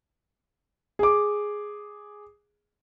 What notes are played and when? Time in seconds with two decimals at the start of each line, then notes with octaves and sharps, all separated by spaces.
0.99 G#4 D6